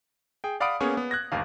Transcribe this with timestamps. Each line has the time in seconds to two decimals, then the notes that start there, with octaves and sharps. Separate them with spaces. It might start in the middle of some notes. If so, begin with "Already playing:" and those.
0.44 G#4 G5
0.60 D5 F5 F#5 B5 D#6 D7
0.80 A#3 B3 C#4 G#4 C#5 G#5
0.97 B3
1.11 F#6 G#6 A#6
1.32 G1 D#2 F5